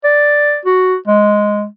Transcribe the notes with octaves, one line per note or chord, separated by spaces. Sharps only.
D5
F#4
G#3